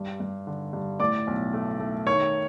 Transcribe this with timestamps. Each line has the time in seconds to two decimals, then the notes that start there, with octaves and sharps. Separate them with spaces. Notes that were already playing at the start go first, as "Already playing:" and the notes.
Already playing: G2
0.20 G2
0.47 D3
0.73 G2
1.00 A2 D5 D6
1.27 B1
1.53 A3
1.80 A3
2.07 D#3 C#5 C#6